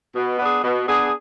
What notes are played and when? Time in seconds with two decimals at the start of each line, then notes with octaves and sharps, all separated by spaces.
0.15 B2
0.39 B3 D4 G#4
0.63 B2
0.86 B3 D4 G#4